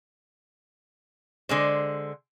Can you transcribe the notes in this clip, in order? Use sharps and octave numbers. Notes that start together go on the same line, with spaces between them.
D3 G#3 C5